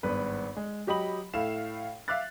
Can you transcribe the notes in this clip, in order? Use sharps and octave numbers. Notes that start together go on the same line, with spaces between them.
G#1 G2 B3 B4
G#3
F#3 G4 D#5 B5 F#7
A2 A3 E4 F5 E7
E5 F5 D6 F#6 A6